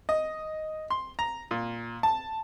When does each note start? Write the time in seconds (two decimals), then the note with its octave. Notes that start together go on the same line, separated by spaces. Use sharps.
0.09 D#5
0.90 C6
1.19 A#5
1.51 A#2
2.03 A5